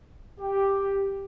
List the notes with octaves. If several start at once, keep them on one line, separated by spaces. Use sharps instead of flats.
G4